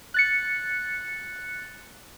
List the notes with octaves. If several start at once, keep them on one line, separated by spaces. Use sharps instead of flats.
F#6 A6 C#7